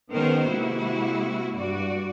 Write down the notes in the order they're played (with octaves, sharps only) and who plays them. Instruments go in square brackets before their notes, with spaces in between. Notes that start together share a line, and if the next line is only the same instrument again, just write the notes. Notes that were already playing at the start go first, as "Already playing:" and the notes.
[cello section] D#3 G#3 B3 C#4 A#4 C5
C3 G#3 A#3 E4 F#4
G2 F#4 D5